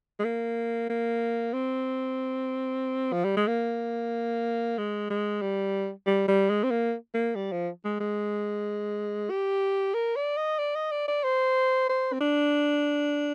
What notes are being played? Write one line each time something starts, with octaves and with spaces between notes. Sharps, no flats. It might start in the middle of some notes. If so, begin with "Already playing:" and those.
G#3
A#3
A#3
C4
F3
G3
G#3
A#3
G#3
G#3
G3
G3
G3
G#3
C4
A#3
A#3
G3
F3
G#3
G#3
G4
A#4
D5
D#5
D5
D#5
D5
D5
C5
C5
C4
D4